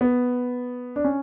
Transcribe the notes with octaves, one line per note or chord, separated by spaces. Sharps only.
B3
D4
C#4